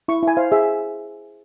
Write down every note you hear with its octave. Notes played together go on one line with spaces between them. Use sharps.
E4 C#6
E4 G#5
C5 F5
G#4 E5